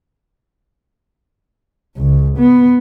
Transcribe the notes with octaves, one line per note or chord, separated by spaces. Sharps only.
C#2
B3